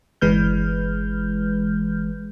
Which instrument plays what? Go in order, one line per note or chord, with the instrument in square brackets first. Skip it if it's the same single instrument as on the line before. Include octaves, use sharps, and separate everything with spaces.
[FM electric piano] G1 E3 G#3 B4 F6 G6